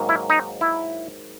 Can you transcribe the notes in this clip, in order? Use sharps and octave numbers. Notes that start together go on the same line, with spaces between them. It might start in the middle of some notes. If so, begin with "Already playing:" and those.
Already playing: G#2 D#3 F#3 A#3
E4
D#4
E4